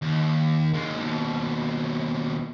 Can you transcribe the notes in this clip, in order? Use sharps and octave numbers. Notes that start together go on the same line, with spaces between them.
D#2
D#2 G#3
D#2 B2